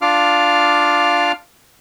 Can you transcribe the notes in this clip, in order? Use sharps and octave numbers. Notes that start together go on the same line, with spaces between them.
D4 F4 F5 D6 F6